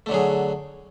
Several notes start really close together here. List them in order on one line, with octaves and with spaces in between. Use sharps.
A3 D3 F#3 G#4